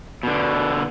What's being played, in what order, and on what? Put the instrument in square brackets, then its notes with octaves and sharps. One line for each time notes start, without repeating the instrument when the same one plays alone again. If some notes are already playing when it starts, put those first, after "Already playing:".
[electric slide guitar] B2 D3